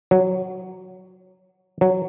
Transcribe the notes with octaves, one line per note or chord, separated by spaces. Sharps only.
F#3
F#3